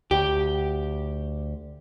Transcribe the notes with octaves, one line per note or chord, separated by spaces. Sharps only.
D2 G4